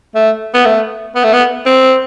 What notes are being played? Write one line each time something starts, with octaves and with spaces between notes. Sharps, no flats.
A3
B3
A3
B3
A3
B3
C4